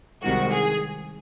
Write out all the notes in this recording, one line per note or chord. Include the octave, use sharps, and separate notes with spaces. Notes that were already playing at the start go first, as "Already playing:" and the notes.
C2 C3 D#3 G#3 F#4
G#4